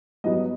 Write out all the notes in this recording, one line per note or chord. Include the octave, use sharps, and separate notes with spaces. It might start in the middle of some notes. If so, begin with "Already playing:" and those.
G2 F#3 B3 D#5